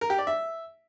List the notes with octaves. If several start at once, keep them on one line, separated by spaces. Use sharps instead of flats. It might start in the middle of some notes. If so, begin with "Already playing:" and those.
A#4
G4
D5
E5